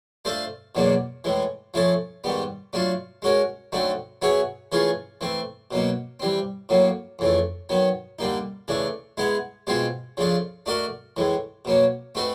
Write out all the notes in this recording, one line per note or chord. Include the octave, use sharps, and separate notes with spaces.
A3 D4 F4 A4 C5
E2 B2 F#3 A#3 D4
A2 E3 G#3
F3 A3 C#4 E4 A4
G#2 D#3 G3 B3
F#3 A3 D4 F4
G#3 C#4 F#4 A#4
D3 F#3 A3 C4 D#4
F#3 B3 E4 G#4 C#5
E3 A3 C#4 F4 G#4
E3 A3 C4
B2 F#3 A#3 D#4
E3 G3 C4
A2 F#3 A#3
F2 C#3 E3 A3
D#3 F#3 B3
D3 G3 A#3 D#4
C#3 E3 A3 D4
G#3 B3 E4 G#4
B2 G#3 C4 F4 G#4
C#3 F3 A3 D4 F4
A3 D4 F#4 A#4 D#5
A2 E3 G#3
B2 F#3 A#3 C#4
A3 C4 D#4 F#4 B4